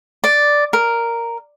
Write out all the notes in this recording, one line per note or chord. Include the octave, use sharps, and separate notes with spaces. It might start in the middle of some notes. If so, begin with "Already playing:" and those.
D5
A#4